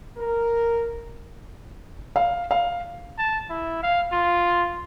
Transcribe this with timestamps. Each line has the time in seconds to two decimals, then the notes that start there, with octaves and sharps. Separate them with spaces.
0.18 A#4
2.16 F5
2.51 F5
3.18 A5
3.50 E4
3.83 F5
4.12 F4